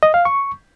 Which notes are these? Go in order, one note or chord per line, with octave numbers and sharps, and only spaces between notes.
D#5
F5
C#6